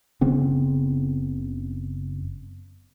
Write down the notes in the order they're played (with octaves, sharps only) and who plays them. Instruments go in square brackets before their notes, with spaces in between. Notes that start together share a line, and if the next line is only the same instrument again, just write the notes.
[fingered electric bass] F#1 C#3 B3 C4